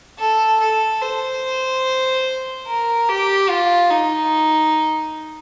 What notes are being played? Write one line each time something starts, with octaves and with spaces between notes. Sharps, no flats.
A4
A4
C5
A#4
G4
F4
D#4